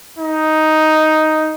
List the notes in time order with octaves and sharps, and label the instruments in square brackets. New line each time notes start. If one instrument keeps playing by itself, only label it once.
[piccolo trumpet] D#4